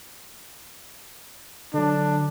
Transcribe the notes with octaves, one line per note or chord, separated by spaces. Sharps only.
D3 F#3 D4